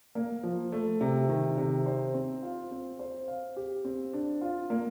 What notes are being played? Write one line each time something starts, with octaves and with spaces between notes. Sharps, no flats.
A#3
F3
A3
C3
D#3
C3
C5
C4
F4
C4
C5
F5
G4
C4
D4
F4
A#3